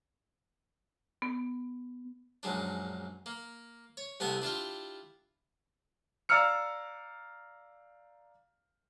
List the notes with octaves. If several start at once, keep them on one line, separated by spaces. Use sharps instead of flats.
B3
A#1 F#2 G#3 D4
A#3
C#5
C2 C3 A3 B3 G#5 A5
D4 E4 F4 G4
D5 F5 A#5 E6 F6 C#7